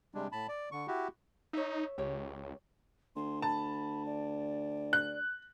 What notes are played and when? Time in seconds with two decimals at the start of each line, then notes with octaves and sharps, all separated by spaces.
0.14 C3 G3 G#3 D4
0.32 A2 A5 B5
0.49 D5
0.72 D3 C#6
0.88 E4 F#4 G4
1.53 D#4 C#5 E5
1.98 C#2 G4 C#5
3.16 D2 C6
3.42 A5 B5
4.06 D5
4.93 F#6